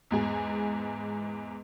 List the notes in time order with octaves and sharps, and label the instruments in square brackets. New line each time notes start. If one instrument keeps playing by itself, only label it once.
[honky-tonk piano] E2 G#2 G#4